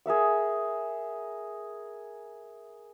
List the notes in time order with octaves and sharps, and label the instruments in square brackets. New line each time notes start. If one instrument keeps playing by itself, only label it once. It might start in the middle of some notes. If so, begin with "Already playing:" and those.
[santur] G#4 A#4 E5 F#5